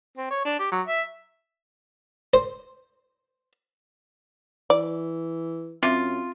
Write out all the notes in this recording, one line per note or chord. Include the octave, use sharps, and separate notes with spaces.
C4
C#5
D4
G4
F#3
E5
C5
E3 D5
F#2 C4 F4 E5 D6